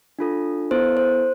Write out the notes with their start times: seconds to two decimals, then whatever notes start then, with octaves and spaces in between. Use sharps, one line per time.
0.19 D4 F4 A4
0.71 B3 E4 A4 C5
0.97 C5